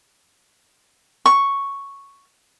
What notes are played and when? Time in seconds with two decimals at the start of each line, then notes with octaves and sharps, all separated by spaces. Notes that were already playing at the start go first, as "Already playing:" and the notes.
1.26 C#6